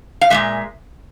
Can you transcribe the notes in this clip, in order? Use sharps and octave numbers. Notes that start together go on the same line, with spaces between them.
F5
A#2 F3 G#3 E5